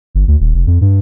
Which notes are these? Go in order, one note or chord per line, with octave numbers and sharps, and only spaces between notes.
G1
D2
D#1
F1
F2
G2